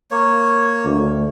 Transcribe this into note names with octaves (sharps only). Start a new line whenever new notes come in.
A#3 C#5
D2